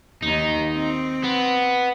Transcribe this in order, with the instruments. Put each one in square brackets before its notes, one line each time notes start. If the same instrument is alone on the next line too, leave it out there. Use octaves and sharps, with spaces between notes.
[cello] D#2 D#3 [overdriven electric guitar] D#4
[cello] C4
[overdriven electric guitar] B3